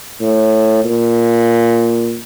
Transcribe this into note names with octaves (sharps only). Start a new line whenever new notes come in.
A2
A#2